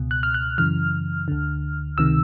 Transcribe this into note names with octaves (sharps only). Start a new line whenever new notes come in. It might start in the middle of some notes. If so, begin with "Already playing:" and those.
Already playing: C#2 B2
F#6
F6
F#6
F#2 C#3 E3 F6
D2 D3
C#2 C3 D#3 E6